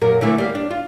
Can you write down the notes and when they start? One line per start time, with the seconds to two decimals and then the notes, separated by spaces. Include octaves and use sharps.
0.01 F#2 A#2 A#4
0.21 D3 E3 A3
0.38 G3 A#3
0.55 D4
0.71 F4